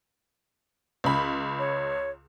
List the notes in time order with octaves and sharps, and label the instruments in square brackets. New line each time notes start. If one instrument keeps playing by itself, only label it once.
[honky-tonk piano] C#2 B5
[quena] C#5